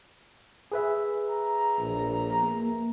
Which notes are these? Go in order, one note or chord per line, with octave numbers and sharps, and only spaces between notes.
G#4 B4 E5
A#5
A#1
A#3